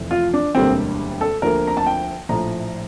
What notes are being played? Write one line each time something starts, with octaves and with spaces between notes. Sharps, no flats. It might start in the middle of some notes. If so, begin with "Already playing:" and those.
Already playing: F1 F2 E3 A3
F4
D4
E1 D2 D3 G3 A#3 C4
A4
D2 D3 F3 A#3 A#4
A#5
A5
G5
A#1 A2 F3 A#5